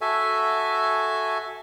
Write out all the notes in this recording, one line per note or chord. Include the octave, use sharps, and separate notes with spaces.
F#4 A4 E5 G#5